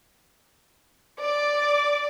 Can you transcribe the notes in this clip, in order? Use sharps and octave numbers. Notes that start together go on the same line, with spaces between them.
D5 D6